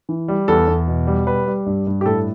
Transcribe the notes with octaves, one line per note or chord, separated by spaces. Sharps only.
E3
G3
E2 A4
E2
B2
G3
G3 B4
G3
G2
G2
G4
A2 A4